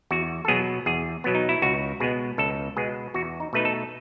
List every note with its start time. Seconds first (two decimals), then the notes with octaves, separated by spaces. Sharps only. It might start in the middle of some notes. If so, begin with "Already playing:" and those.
0.11 E2 F#4
0.45 A4
0.48 B2 F#3 B3 G#4
0.86 E2 G#4
1.24 B2 F#3 B3
1.35 D#4
1.49 E4
1.62 C#2 F#4
2.00 B2 G#3 B3 G#4
2.38 C#2 A4
2.77 B2 G#3 B3 G#4
3.14 E2 F#4
3.40 D#4
3.53 B2 A3 D#4 B4
3.65 A4